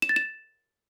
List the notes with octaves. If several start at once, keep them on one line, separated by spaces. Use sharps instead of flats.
E7
A6
E7